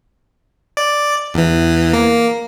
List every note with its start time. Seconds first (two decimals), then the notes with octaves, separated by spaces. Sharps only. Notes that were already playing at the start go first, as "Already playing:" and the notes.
0.77 D5
1.34 E2 E3
1.93 A#3